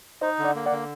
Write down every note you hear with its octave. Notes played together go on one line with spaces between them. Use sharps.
D#4 C5 D#5
D3
D5 F#5
A#3
D5 F#5
D3